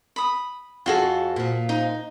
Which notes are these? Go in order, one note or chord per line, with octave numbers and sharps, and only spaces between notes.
B5 D#6
F2 F4 F#4 G#4 A4
A#2 F3
D#4